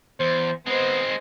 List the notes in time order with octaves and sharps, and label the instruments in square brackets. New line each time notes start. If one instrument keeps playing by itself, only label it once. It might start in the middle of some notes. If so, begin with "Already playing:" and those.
[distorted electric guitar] E2 [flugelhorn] C5
[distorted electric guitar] G#3 C4 [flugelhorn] B3 [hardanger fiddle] C5 D#5